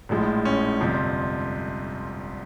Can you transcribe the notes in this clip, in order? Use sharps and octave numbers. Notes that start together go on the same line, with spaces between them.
A#1 A2 F3 G#3
C#4
G1 F2 C3 F3